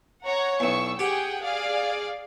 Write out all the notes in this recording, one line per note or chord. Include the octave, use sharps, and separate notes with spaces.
C#5 F#5 A#5
B1 E2 C#6 E6
G4 G#4 F#5 G5
G#4 D5 F5